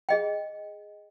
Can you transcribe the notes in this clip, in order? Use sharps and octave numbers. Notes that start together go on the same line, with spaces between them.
G#4 D#5 G5